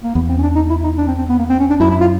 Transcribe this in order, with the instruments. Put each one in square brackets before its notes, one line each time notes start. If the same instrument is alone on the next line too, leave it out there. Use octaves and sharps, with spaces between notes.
[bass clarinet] A#3
[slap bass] E2 [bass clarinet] B3
[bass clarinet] C4
C#4
D4
D#4
E4
D#4
D4
C4
C4
B3
A#3
C4
C#4
D4
[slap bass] F#2 [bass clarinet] E4
[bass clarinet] E4
F4